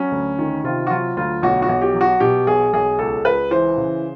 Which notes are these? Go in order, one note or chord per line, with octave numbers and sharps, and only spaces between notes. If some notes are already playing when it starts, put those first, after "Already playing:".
Already playing: F#3 C#4
D2
D#3
C3 F4
F#4
F#3 F4
D2 F4
B1 F#4
F#4
B1
G4
F#3
F#4
B2 G4
B1 G#4
B1 G#4
C#2 A4
C#2 B4
E3 C5
C#3